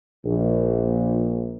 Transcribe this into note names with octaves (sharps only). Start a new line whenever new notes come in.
A#1